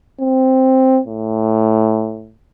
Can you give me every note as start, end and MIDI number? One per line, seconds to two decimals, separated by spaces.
0.20 1.01 60
1.07 2.33 45